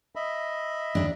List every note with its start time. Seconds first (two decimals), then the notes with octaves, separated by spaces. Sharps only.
0.16 D#5 E5 B5
0.95 D#2 G#2 D4